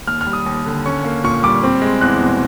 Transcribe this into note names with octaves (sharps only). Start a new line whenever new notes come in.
D#2 F6
F6
G3
D#6
D#2
D3
C#4 C#6
A#3
A#2 C#6
G3 D6
C4
G#3
E2 F#6
B2